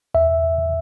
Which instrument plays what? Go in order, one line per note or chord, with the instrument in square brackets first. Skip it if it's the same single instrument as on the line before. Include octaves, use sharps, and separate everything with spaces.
[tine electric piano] E2 E5